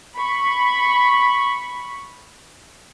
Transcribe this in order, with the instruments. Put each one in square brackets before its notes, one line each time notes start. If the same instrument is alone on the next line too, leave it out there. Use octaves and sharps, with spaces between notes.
[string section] B5 C#6